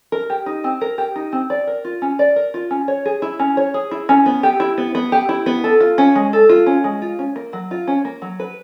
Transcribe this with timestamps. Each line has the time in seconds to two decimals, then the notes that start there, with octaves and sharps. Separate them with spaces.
0.12 A#4
0.30 G4
0.46 D#4
0.64 C4
0.81 A#4
0.98 G4
1.16 D#4
1.33 C4
1.50 D5
1.67 A#4
1.85 F4
2.02 C#4
2.19 D5
2.36 A#4
2.54 F4
2.71 C#4
2.88 C#5
3.06 G#4
3.22 E4
3.39 C#4
3.57 C#5
3.74 G#4
3.91 E4
4.09 C#4
4.26 B3
4.43 G4
4.60 E4
4.78 B3
4.95 B3
5.12 G4
5.29 E4
5.46 B3
5.64 A4
5.80 F4
5.98 C#4
6.15 G#3
6.33 A4
6.49 F4
6.67 C#4
6.84 G#3
7.02 F4
7.19 C#4
7.36 A#3
7.53 F#3
7.71 F4
7.87 C#4
8.05 A#3
8.22 F#3
8.40 B4